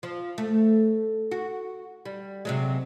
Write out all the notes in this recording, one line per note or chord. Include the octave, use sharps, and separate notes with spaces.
F3
A3
F#4
G3
C3 F#3 G#3